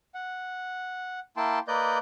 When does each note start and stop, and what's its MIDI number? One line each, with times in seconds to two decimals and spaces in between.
0.14 1.20 78
1.37 1.59 58
1.37 1.59 64
1.37 1.59 79
1.37 1.59 81
1.37 1.59 84
1.68 1.98 58
1.68 1.98 71
1.68 1.98 74
1.68 1.98 75
1.68 1.98 91